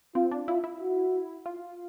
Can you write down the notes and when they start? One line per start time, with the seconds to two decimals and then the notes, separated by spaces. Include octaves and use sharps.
0.15 C4 F4
0.31 D4
0.47 E4 F4
0.64 E4
0.80 F#4
1.46 F4